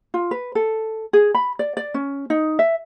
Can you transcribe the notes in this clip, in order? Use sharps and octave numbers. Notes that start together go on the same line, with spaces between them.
F4
B4
A4
G#4
B5
D5
D5
C#4
D#4
E5